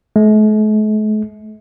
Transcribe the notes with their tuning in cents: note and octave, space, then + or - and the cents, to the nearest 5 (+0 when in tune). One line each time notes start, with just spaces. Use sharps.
A3 -45